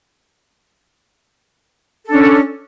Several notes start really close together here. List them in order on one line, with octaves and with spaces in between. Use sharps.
A4 D4 C#4